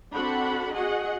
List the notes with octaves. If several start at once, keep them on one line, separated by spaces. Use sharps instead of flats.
C4 D4 F#4 A4 F#5 B5
F#4 G#4 D#5 F#5